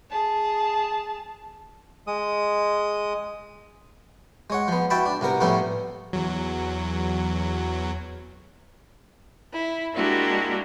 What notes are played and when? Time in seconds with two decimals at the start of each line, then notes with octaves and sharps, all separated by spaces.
0.10 G#4 A5
2.07 G#3 D#6
4.50 G#3 C#5 F#5
4.68 F3 B3
4.90 E4 F#4 G5 A5 B5
5.06 D4
5.21 C2 C3 B3 A#4
5.41 A2 F3 G3 B3 C#4 E4
6.13 E2 F#3
9.51 E4
9.94 G#3 A#3 D4 E4 F#4 G4